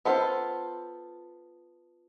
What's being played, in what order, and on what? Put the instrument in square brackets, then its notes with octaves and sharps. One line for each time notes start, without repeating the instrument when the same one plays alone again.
[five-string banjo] B3 F4 A4 C5